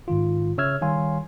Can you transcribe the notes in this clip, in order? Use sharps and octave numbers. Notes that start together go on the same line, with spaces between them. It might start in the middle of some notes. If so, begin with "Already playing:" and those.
G#2 D#3 F4
C#3 C#5 E5 E6 F6 G#6
D#3 G3 C#5 F5 G#5 C6